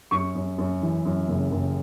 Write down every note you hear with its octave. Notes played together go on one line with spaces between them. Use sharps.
F#2 C#6
F#2
F#2
E3
F#2
F#1
F#1